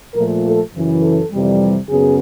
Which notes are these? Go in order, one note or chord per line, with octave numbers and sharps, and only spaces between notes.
A#2 F3 A3 A#4
A4
F#2 C#3 E3
A4
F2 C3 E3 G3
F#2 C#3 F#3 B3 G#4